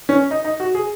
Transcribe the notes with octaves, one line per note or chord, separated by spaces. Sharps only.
C#4
D#4
D#4
F#4
G#4